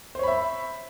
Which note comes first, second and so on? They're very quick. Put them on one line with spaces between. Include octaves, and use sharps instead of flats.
C5 C#5 B5 E5